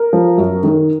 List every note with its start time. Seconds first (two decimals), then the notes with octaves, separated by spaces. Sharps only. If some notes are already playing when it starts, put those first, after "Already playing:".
Already playing: A#4
0.13 F3
0.38 F#2
0.64 D#3